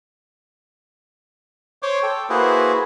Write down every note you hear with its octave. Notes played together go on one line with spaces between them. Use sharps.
C5 C#5 C6 D6
A4 G5
A#3 E4 F#4 G#4 B4 C5